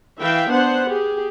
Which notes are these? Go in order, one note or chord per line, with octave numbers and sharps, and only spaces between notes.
E3 E5 F5 G5
B3 D4 C5 F#5
G4 G#4